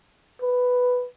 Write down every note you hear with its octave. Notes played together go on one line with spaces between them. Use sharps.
B4